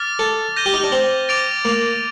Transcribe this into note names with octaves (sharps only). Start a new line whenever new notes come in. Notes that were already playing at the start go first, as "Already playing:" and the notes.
Already playing: D6 F6 A6
A4
G6 A#6 D#7 G7
G4
D#4
D4
C4
D6 A6 D7 F7
A#3